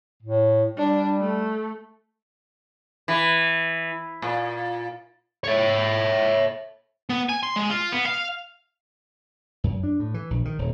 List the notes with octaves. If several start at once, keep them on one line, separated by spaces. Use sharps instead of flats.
A2
G3 D4
A3
E3
A#2
C#5 E5
B3
G#5
C6
G#3
F4
B3
F5
F#2
D4
A2
E3
A#1
D#3
D#1